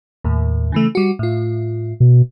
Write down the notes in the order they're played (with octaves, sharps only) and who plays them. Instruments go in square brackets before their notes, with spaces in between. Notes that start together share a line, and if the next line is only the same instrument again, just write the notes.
[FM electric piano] D#2 A2
C#3 E3 A3
G3 F#4
A2 F4
[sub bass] B2